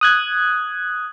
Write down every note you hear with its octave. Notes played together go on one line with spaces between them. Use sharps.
D#6 F#6 G#6